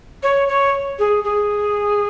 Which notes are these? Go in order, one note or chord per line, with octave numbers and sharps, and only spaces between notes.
C#5
C#5
G#4
G#4